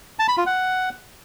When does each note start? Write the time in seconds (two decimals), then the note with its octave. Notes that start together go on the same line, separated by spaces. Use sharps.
0.19 A5
0.28 B5
0.37 F4
0.46 F#5